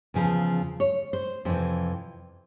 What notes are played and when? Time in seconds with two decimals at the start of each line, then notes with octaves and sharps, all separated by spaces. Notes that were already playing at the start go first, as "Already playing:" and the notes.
0.14 E2 C#3 F3
0.80 C#5
1.13 C5
1.45 F2 C3 E3 C5